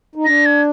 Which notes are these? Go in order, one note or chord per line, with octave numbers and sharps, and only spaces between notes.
D#4
D4 A#6
G#6